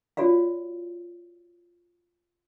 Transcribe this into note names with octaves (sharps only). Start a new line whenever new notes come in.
F4 F#4 C#5 D5 F5